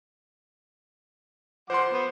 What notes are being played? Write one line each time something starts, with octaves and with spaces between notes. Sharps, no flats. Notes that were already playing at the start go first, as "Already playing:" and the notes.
F3 C5 F#5 C6 D6
B3